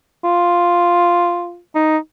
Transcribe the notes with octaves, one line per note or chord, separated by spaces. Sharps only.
F4
D#4